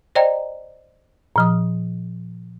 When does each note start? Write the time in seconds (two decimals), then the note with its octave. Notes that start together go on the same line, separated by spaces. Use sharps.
0.15 C5 D5 D#5 G5 A#5
1.36 A#2 F3 D#6